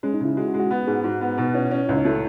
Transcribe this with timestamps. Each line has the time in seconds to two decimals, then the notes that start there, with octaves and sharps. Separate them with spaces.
0.03 G#3 C#4
0.14 D#4
0.20 C#3
0.25 E4
0.37 G#3 F#4
0.48 F#4
0.54 G#3
0.59 F#4
0.71 B3
0.87 G#2 G#4
1.04 G#2 F#4
1.21 B3
1.38 B2 D#4
1.54 C#4 E4
1.71 C#4
1.88 C#2 E4
1.97 D#4
2.05 A3 E4